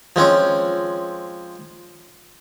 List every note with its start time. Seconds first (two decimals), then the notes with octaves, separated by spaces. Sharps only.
0.16 F3 G#3 C4 C#4